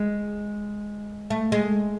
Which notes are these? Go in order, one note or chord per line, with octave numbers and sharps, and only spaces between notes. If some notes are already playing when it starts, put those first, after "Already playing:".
Already playing: G#3
A3
G#3